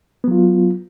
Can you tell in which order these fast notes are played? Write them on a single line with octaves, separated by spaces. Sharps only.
B3 F#3 F4